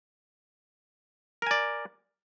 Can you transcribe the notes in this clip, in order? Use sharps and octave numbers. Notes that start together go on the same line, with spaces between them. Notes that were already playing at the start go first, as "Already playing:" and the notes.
A#4 D5 G#5